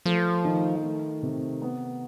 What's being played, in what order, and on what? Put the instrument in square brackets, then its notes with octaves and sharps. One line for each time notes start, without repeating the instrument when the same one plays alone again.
[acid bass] F3 [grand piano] A3
[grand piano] D#3
A3
C3
B3